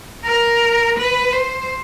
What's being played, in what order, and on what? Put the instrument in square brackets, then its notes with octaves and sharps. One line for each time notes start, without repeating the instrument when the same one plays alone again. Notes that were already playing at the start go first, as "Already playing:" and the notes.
[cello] A#4
B4
C5